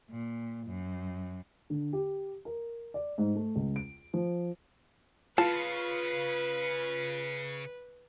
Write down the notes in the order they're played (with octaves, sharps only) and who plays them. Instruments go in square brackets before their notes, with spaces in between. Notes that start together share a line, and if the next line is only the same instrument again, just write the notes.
[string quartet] A#2
F#2
[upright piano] D3
G4
A#4
D5
G#2
A3
C#2
D7
F3
[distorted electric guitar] C#3 [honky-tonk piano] F4 [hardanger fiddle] B4 [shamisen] A5